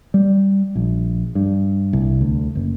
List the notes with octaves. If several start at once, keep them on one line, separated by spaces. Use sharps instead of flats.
G3
A#1
G2
C2
D2
F#1